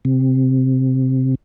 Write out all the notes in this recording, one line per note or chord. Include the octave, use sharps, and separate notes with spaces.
C3